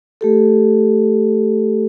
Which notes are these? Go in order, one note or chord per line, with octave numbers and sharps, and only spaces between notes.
A3 G4 A4